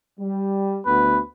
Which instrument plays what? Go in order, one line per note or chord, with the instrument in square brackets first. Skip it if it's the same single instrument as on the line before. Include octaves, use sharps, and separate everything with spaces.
[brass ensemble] G3
[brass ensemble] D2 B3 [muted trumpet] B4